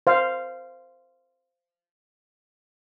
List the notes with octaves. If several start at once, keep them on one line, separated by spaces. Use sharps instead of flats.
C5 F5